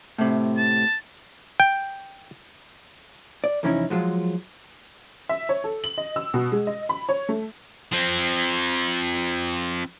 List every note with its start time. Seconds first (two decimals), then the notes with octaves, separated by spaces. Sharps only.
0.18 A2 C3
0.57 A5
1.60 G5
3.44 D5
3.63 C2 F2 E3 C#4 D#4 E4
3.90 F3 F#3 G#3 F4
5.29 E5
5.49 C#5
5.64 A4
5.84 F#7
5.98 D#5
6.16 E6
6.34 B2
6.52 G#3
6.67 D#5
6.89 B5
7.09 C#5
7.29 A3
7.92 F3 C4